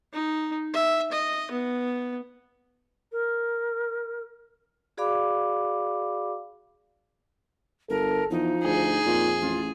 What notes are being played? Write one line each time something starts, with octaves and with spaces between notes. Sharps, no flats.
D#4
E5
D#5
B3
A#4
F#4 G#4 D5 F5 B5 D6
G1 A4 A#4
E2 F3 D#4
D2 G#4
F2 A#2
A1 F4